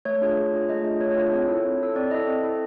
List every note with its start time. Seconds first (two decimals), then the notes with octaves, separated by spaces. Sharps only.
0.05 A3 C#5
0.21 D4 F4 G#4
0.37 A3
0.53 D4 F4 G#4
0.69 A3 D#5
0.84 D4 F4 G#4
1.01 A3 C#5
1.11 C#5
1.17 D4 F4 G#4
1.32 C4 C#5
1.48 E4 A4
1.64 C4
1.80 E4 A4
1.95 C4 D5
2.11 E4 A4 D#5
2.27 C4
2.43 E4 A4